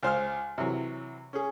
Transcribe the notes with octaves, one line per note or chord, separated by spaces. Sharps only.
C#2 C5 F5 F6
C3 E3 F#3
C#4 G#4